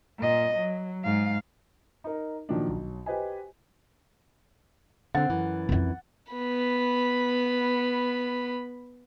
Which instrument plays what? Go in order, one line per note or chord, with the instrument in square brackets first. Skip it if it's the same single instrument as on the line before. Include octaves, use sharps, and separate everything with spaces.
[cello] A#2 D#5
F#3
G#2 F5
[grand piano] D#4 A#4
A#2 D#3 F3 F#3 A#3 D4
B1
G4 B4 C5 D#5 G#5
[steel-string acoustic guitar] D3 C4 [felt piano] F#5 A6
[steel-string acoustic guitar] F#2 E3
[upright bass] F2 E4
[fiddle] B3 B5